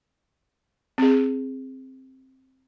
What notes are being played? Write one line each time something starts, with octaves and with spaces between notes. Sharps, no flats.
C4 G#4